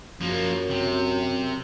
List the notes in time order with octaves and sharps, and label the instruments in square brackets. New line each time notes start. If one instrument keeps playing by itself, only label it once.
[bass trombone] F#2 [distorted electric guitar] F3 A#3
[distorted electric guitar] C3